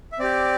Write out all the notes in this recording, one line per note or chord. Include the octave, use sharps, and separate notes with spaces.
E5
C4 G4 D5